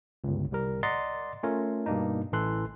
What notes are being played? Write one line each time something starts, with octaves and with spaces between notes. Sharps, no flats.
G1 C#2
C2 G3 A#4
D5 D#5 F#5 A#5 C6 A6
A3 C#4 F4 A#4 C#5
G2 B2 A#3 D4 D#4
A1 A2 E3 A4 C6 F#6